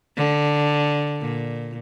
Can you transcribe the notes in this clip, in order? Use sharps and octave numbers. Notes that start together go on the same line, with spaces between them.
D3
A#2